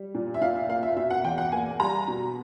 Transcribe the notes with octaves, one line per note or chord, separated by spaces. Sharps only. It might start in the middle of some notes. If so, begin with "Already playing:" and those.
Already playing: G3
A#2
E5
A#2 F5
E5
A#3 F5
E5
B2 E5
F#5
E2 G5
F#5
A#3 G#5
G3 A#5
B2